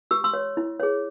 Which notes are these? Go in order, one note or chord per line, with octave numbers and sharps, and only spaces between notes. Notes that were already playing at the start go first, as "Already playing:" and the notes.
G4 E6
C6 E6
C#5
E4
G#4 C#5